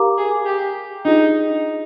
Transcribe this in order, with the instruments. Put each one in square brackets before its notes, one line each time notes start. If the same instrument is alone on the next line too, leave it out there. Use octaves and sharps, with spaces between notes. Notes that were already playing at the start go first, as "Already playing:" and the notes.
Already playing: [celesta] G4 A#4 F5 A#5 D6
[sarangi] G#4
G4
[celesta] D4 F4 G#4 [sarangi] D#4